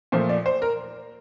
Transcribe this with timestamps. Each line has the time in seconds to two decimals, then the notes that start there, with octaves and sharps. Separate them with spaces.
0.12 A#2 F3 A3 C5
0.29 D5
0.46 C5
0.62 A#4